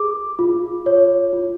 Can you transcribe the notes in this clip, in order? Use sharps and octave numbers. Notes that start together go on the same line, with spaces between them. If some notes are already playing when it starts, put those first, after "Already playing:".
Already playing: G#4 D6
F4
C#5
F4